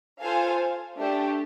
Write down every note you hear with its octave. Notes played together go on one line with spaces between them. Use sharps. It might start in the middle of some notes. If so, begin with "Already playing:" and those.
F4 A4 C5 F5 G#5
A3 D4 G4